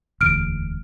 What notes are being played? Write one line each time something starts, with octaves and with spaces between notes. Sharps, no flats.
E1 D2 F6 D7